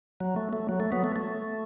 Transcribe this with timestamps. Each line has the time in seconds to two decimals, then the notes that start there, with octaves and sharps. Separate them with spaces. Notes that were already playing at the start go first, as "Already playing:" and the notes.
0.20 F#3
0.36 A3
0.53 A3
0.69 F#3
0.80 A3
0.92 F#3 B3
1.04 A3
1.16 A3